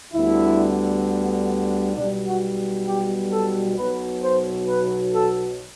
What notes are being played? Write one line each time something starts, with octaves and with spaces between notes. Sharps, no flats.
D2 D3 G3 B3 E4
B1 B2 G3 D4
F#4
G4
A4
B1 B2 F#3 B4
C5
B4
A4